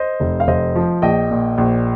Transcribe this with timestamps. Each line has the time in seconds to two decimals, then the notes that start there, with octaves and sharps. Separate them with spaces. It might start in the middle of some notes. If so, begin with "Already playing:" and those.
Already playing: C5 D#5
0.20 F1
0.40 F5
0.47 F1 C5 D#5
0.76 F3
1.02 A#1 D#5 G5
1.31 A#2
1.58 A#1